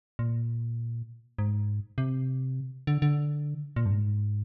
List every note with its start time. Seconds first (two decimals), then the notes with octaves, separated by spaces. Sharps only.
0.19 A#2
1.39 G#2
1.98 C3
2.87 D3
3.02 D3
3.76 A#2
3.86 G2
3.91 G#2